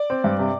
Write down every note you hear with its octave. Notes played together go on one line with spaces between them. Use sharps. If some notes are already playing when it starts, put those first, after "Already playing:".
Already playing: D5
C4
G2
C3